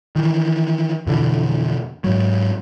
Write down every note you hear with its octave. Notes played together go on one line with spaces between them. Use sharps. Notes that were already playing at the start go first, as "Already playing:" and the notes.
D#3 E3
F2 B2 D3 E3
G#2 F#3